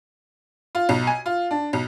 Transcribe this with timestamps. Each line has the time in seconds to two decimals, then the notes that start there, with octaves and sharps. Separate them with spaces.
0.75 F4
0.89 B1
1.07 G#5
1.26 F4
1.51 D4
1.73 B1